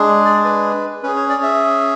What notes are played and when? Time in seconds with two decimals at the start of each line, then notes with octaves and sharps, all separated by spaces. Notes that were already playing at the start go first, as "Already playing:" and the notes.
Already playing: G#3 D4 G#4
0.25 D5
0.45 B4
1.03 C#4 G#4 B4
1.16 C#5
1.29 D5
1.43 E5